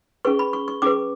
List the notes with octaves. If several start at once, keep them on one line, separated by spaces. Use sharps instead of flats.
C#4 G#4 B4 C#6
B5
C#6
C#6
C#4 G#4 B4 D6